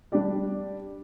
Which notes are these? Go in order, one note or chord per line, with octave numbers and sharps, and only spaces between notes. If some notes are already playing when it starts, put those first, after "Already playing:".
G3 D4 G4 D5